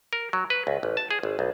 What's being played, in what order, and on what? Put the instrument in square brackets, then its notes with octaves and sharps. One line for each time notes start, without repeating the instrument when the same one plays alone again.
[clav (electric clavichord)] A#4
F#3
B4
C#2
A1
A5
G#4
G#1
B1